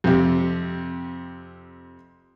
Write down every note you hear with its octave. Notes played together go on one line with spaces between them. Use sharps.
F2 C3